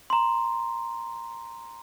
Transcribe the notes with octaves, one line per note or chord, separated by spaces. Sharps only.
A#5 C6